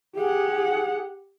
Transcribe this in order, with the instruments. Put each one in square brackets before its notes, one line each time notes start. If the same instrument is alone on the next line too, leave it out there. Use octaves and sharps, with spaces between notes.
[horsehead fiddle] G4 F#5 [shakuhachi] G#4